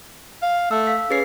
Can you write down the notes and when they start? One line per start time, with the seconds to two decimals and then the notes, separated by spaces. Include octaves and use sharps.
0.43 F5
0.71 A3 E6
0.87 F5 B6
1.10 C#4 G#4 B4 C7